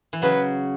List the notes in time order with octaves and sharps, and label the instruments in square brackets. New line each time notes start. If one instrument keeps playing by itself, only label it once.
[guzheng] E3
[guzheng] C#3 F#3 [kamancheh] B4